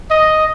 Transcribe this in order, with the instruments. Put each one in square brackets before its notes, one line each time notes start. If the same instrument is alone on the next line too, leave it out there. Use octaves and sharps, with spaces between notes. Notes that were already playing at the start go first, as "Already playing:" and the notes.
[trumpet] D#5